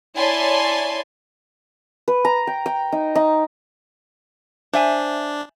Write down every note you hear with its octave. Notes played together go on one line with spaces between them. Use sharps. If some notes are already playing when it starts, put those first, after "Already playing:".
E4 C#5 D5 G#5 A5 C6
B4
A#5
G5
G5
D#4
D#4
D4 C5 E5 G#5